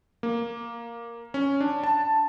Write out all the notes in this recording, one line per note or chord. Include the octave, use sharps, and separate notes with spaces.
A#3
C#4
D4
A5